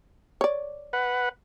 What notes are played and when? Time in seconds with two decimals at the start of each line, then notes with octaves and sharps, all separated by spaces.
0.41 C#5 D5
0.93 B4 F#5